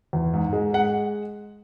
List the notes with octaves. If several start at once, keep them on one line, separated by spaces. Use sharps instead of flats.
E2
G#2
G#3
G#3 F#5